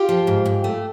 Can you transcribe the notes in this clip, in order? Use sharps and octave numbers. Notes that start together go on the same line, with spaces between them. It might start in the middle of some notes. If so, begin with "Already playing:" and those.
Already playing: F4 G4
F3
G#2
G#2
A3